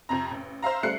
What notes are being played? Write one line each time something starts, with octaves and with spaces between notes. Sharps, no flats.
F2 C3 A#5
A1
C5 E5 F5 A#5
G3 A3 F#6 C7 C#7